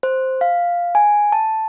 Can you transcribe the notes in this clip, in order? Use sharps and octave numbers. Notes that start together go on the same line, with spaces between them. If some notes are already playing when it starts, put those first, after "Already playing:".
C5
F5
G#5
A5